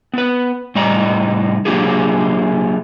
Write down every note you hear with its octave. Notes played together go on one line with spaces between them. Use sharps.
B3 B4
A2 G3 D#4 D5 A#5
F#3 A#3 D4 F4 G4 G#4